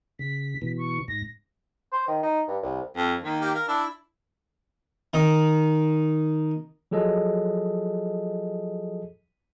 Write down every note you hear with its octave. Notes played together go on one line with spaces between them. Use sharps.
C#3 B6
B2 E3
C#6
G#2 A#6
C5
D#3
D#4
G2
C2
F2
D#3 A#3
A#3 G4
A#4 F5
D4 E4
D#3 D#4
F3 F#3 G#4 A4 D#5